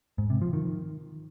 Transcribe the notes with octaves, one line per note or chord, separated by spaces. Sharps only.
G#2
C3
F3
D#3